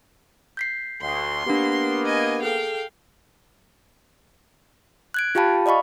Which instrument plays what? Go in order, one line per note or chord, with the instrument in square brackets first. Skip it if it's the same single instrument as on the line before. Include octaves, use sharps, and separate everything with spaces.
[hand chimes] G6 B6 C7
[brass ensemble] D2 [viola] C6
[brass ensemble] A#3 B3 [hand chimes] D4 G4
[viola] D#5 G#5
[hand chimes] G#4 A4 [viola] F5 G5
[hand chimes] F#6 G#6 D7
F4 G4 F5 G5 A5 B5
D5 D#5 F5 B5 C#6